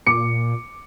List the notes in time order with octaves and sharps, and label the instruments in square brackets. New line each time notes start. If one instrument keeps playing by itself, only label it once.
[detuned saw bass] A#2 [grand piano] D6 C#7